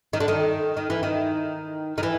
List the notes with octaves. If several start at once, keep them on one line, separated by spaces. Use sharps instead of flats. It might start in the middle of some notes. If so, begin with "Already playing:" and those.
D#3
D3
D#3
D#3
E3
D#3
D#3
E3